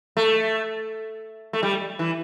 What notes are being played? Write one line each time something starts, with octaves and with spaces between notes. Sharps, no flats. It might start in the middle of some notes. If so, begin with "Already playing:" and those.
A3
A3
G3
E3